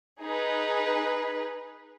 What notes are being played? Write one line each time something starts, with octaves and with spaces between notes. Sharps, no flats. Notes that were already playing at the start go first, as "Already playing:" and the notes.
D#4 G#4 B4